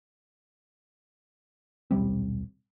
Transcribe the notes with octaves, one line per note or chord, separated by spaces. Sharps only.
D#1 B1 G3 C4